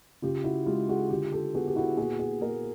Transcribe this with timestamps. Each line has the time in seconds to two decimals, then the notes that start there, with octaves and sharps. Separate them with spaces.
0.22 C#3 F4 G4
0.44 E4 F#4
0.66 G#3 F4 G4
0.89 F#4 G#4
1.10 D3 F4 G4
1.32 G4 A4
1.54 B3 F#4 G#4
1.68 G4
1.76 E4 F#4
1.97 A#2 F#4 G#4
2.19 F#4 G#4
2.41 A#3 G#4 A#4